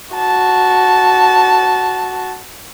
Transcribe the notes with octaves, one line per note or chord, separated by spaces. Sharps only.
F#4 A5